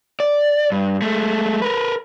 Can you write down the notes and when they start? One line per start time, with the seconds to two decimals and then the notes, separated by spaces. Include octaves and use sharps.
0.20 D5
0.72 G2
1.02 G#3 A3
1.62 A#4 B4